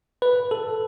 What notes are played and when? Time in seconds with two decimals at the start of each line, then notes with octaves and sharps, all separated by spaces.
0.22 B4
0.51 A4